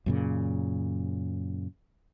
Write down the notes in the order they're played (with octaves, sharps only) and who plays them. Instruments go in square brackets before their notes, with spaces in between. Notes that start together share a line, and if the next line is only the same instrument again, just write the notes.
[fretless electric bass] F#2 A#2 C#3